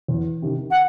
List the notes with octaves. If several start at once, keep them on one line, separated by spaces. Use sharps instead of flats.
E2
C3 D#3
F#5